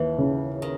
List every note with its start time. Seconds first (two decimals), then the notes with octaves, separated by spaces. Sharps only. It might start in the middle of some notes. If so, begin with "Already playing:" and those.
Already playing: D#2 E3
0.18 C#3
0.62 D#3